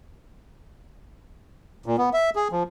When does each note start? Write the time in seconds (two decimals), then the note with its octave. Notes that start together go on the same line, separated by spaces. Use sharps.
1.86 A#2
1.98 B3
2.13 E5
2.36 G#4
2.52 F3